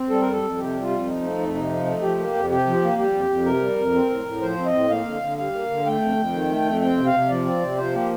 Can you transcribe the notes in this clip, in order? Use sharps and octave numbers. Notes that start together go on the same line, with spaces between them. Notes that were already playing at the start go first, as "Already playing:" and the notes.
Already playing: C4
G3 A4
F2 A#4
A4
F2
C3 G4
G3
F4
F2
F3 D#4
A3
F2
C3 D#4
F3
A3
F3 G4
A#3
F2
C3 G4
F3
A#3
G3 G4
F2
F2
C3 A#4
G3
F2
C4
A2
A2
F3 C5
C4
D#5
A2
A#3 F5
D3
D3
G3 F5
A#3
D3
A3 G5
F2
F2
D#3
A3
F2
C4 G5
C3
F5
C3
F3 D5
C4
C3
F3 C5
A#3 G4